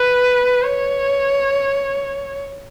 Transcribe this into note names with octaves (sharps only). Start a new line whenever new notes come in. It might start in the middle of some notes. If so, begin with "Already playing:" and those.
Already playing: B4
C#5